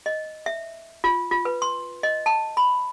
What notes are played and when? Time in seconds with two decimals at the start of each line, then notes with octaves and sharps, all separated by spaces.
0.06 D#5
0.46 E5
1.04 F4
1.31 F4
1.45 B4
1.62 C6
2.03 D#5
2.26 A5
2.57 B5